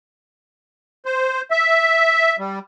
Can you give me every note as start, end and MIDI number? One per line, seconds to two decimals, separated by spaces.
1.06 1.41 72
1.51 2.36 76
2.39 2.59 55